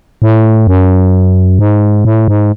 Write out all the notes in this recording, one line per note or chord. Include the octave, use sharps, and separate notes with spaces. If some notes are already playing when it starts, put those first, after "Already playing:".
A2
F#2
G#2
A2
G#2